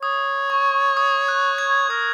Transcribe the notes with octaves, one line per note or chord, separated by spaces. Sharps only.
C#5 D#6
C#6
D#6
F#6
G#6
A#4 D#6